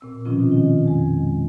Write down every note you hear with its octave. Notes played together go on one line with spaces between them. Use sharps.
A#2 C4 E6
B2 D#3 F3 C4 C#4 F4
D#3 G#3 F4 D#5
F2 G#3